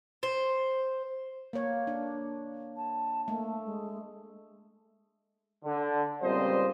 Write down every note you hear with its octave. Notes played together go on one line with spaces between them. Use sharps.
C5
A#3 C#5
D4
A5
A3 A#3
G#3
D3
C#2 A#2 G3 C4 C5 D#5